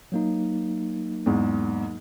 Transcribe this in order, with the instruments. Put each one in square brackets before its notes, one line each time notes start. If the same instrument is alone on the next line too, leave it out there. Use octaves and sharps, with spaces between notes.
[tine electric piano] F#3 A#3 D#4
[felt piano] E2 G#2